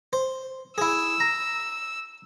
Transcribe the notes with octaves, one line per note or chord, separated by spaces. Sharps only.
C5
E4 G#4 E6
A#5